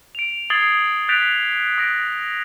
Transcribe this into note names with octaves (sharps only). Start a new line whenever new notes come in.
D7 F7
D#6 G#6 A6 C7 F#7 G7
F#6 G6 A6 B6 D7 F7
D#6 A#6 D7